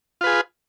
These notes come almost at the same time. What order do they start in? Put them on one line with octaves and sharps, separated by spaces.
F4 B4 G#4